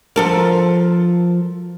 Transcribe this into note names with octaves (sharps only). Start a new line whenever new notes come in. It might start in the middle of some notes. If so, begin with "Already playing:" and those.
F3 A4 A#4